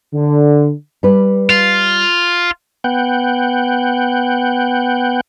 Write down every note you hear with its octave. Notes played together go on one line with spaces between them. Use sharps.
D3
G3 B4
F4
B3 F#5 G5